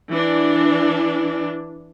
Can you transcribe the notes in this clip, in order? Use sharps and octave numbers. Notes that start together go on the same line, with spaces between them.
E3 D4